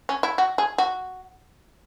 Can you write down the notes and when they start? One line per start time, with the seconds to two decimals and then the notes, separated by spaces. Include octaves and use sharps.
0.09 C#4
0.23 E4
0.38 F#4
0.58 G#4
0.78 F#4